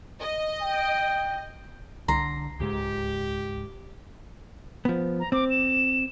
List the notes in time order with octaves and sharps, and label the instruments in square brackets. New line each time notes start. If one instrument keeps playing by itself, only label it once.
[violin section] D#5
[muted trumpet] G5
[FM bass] C2 [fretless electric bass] D3 [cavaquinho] A#5 C6
[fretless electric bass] C#2 G#2 G#3 [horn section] G4
[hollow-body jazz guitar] F3 B3
[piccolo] A#5
[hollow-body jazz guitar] C4 [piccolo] D6
[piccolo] E7